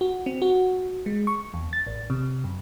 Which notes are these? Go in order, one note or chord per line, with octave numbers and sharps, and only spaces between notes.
F#4
C4
F#4
G#3
C#6
E2
A6
A1
C3
F#2